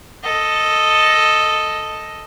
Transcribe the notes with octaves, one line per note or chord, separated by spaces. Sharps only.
A4 D#5